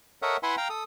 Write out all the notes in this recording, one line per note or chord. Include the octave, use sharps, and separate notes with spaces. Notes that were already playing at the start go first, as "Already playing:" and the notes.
A4 A#4 C#5 D#5 E5 F#5
E4 B4 E5 F#5 G#5 C6
F5 G5 A#5
A4 D#6